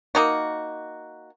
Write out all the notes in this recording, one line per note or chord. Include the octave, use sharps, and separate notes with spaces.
A#3 D#4 F#4